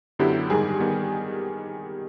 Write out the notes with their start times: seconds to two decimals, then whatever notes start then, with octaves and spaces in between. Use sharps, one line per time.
0.19 F#2 D3 F#3 B3 E4 G4
0.50 G#2 D#3 G3 G#4
0.80 D#3 G3 B3